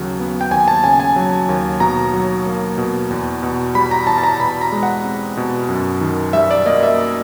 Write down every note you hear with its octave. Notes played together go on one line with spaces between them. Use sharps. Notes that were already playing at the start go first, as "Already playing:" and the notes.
Already playing: D#2 C#3 F#3
B3
G5
D#2 G#5
A5
C#3 G#5
G#5
F#3
D#2
B2 A#5
F#3
A#3
B2
E2
B2
G3 B5
A#5
E2 A5
A5
A#5
B2 B5
A#5
G#3
F#5
C4
B2
F#2
D#3
G3 E5
D5
A#3 D#5
E5